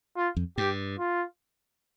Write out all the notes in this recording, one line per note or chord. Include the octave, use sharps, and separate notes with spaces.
F4
F2
G2 G4
F4